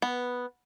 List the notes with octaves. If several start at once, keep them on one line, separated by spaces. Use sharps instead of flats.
B3